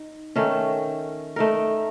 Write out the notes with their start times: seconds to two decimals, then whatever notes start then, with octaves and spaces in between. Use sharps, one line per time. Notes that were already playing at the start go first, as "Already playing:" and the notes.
Already playing: D#4
0.36 D#3 A3 C#4
1.36 A3 D#4 A#4